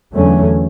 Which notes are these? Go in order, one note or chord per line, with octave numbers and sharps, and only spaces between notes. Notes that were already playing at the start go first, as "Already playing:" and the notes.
E2 D3 F#3 A3 C#4